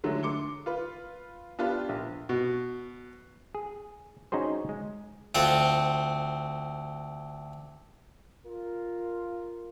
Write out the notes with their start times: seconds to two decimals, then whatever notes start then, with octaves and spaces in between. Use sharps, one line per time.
0.04 D3 F#3 G#3 A3
0.23 C6 D6 C#7 G7
0.66 F4 B4
1.59 B3 D4 F4 G4 B4
1.89 A#1
2.29 B2
3.55 G#4
4.32 C#4 D#4 F#4 G#4 C5
4.69 G#3
5.35 D2 C4 F4 F#5
8.46 F4 A#4